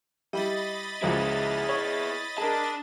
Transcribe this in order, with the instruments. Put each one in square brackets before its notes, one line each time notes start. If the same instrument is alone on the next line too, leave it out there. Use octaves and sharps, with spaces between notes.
[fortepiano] G3 E4 [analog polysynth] D#5 B5 A6
[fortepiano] C#2 F3 F#3 [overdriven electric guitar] E4 G#4
[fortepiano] C#5 E5
[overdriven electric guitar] D4 A5 [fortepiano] G#4 A#4